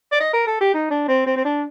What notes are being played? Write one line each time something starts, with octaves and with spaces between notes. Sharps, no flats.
D5
D#5
A#4
A4
G4
D#4
D4
C4
C4
C4
D4